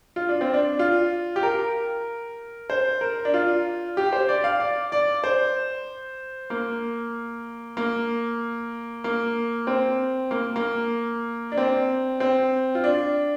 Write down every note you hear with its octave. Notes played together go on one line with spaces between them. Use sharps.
F4
D4
C4
D4
F4
G4
A#4
C5
A#4
D4
F4
G4
C5
D5
F5
D5
D5
C5
A#3
A#3
A#3
C4
A#3
A#3
D4
C4
C4
F4
D4